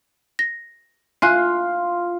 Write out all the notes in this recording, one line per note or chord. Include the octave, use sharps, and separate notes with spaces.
A#6
F4 F5 G#5 F#6